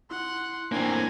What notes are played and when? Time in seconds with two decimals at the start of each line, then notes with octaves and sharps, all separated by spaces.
0.11 E4 F#5 C6
0.72 A2 E3 A#3 C4 D4 G5 G#5 A#5